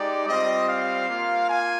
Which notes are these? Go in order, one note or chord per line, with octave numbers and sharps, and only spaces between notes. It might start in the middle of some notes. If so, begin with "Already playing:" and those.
Already playing: G#3 D#4 G4 D5
G3 C4 F4 D#5
F5
A#3 F4
G#5